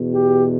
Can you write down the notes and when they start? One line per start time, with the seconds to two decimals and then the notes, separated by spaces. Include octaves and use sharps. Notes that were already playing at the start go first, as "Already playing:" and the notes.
Already playing: E2 B2
0.14 G4